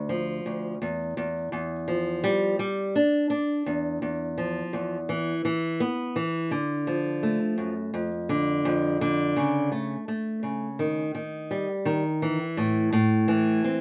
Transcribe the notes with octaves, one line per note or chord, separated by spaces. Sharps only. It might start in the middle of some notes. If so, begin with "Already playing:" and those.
Already playing: D2
F3
D2
E2
E2
E2
F3
G3
G3
D4
D4
E2
E2
F3
E2
E3
E3
B3
E3
D3
F3
A3
F#2
F2
D3
F2
D3
C#3
A3
A3
C#3
D#3
D#3
G3
D#3
E3
A2
A2
E3
C4